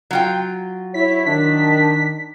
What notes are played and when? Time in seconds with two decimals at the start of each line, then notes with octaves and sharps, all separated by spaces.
0.11 F#3 F4 G5
0.94 E4 C#5 B6
1.26 D#3 D4 B6